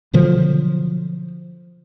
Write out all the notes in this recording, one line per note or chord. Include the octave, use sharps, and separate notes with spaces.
B2 D3 F3 F#3